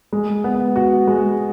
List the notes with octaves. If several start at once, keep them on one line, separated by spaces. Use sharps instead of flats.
G#3
B3
F#4
G#3